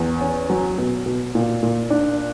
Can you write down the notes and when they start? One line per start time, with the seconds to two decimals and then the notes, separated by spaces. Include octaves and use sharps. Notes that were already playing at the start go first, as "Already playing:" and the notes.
Already playing: E2
0.21 C#4
0.50 F#3
0.78 B2
1.06 B2
1.35 A#2
1.63 A#2
1.90 D4